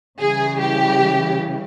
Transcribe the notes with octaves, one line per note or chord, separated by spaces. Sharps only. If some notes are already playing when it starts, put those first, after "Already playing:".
C#3 E3 G3 G#4
G4